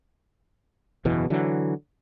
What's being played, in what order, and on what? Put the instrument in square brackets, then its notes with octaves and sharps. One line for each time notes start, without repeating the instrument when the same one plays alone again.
[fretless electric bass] F#1 E2 B2 E3
D3 E3 F#3